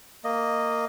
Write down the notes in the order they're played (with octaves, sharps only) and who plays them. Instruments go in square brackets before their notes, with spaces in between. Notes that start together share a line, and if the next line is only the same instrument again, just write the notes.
[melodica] A#3 D#5